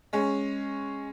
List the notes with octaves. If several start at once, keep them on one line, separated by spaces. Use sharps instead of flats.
G#3 C#4